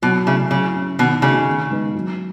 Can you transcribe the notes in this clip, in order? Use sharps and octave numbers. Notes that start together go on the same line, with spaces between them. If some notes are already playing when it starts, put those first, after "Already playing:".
B2 F#3
C#3 A3 E4
C#3 F#3
C#4 E4
B2 D#3
C#3 A3 D#4 F#4
D#3
G#3 B3 D#4
F#3